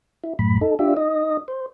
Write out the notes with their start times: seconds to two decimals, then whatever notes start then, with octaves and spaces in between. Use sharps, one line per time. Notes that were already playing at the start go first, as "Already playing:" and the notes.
0.24 E4
0.39 F#2 A2 B5
0.61 D#4 A4
0.79 D4 F4 G4 E5
0.97 D#4 D#5
1.48 C5